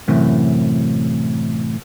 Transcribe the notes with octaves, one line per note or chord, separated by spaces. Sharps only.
F#2 A2 C3 E3